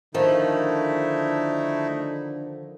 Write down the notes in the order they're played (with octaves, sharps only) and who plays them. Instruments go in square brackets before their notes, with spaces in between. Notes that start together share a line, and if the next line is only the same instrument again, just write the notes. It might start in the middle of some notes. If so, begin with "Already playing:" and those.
[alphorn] D3 [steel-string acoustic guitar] D#3 F3 [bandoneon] A3 D#4 E4